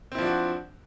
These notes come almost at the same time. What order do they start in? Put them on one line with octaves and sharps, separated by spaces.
C4 E4 F3 D4 F#4